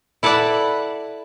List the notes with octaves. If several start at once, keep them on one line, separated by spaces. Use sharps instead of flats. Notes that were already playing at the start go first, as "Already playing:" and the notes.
E4 A4 B4 D5 F#5